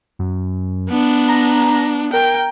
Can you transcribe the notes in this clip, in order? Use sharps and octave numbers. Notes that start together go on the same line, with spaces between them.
F#2
B3 D4
A#5
A#4 G5